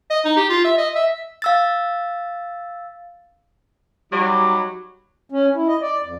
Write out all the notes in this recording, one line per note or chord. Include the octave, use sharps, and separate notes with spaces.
D#5
D#4
G4
F4
E5
D#5
E5
F5 E6 A6
F#3 G3 D#4 B5 D6
C#4
E4
D#5
D5
F2